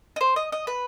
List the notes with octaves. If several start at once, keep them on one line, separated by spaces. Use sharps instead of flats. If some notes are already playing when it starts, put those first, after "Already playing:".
D#5
C5
D#5
D#5
B4